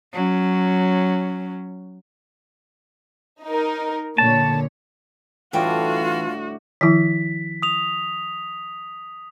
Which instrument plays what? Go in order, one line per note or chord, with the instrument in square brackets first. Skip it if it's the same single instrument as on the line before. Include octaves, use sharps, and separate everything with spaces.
[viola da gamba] F#3 C#4
[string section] D#4 A#4
[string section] A#2 D3 C#5 [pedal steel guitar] A5
[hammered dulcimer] A2 D3 G3 [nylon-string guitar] E3 G5 [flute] F4 [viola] F#4
[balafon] D#3 F3 E4 [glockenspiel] B6
[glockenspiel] D#6 F7